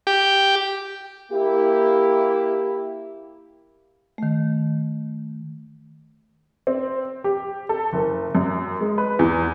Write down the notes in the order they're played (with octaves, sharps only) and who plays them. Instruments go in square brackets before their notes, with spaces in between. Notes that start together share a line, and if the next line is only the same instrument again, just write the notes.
[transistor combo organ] G4
[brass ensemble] A#3 E4 G4
[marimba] D#3 A3
[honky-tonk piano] C4
G4
A4
F#1
F#2
G#3
B4
E2